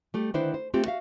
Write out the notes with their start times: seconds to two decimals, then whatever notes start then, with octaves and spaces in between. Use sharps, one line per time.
0.14 G3 A3 G4
0.34 D3 D#3 D4 E4 B4 C5
0.54 C5
0.74 A3 C4 F4 G4
0.86 F#4 E5 F5